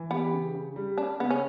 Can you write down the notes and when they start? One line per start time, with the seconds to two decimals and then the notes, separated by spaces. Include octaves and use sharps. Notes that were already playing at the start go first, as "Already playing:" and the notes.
Already playing: E3
0.11 B3 G4
0.33 C#3
0.55 C#3
0.76 G3
0.98 C#4 D4
1.20 C#3 B3
1.30 C#4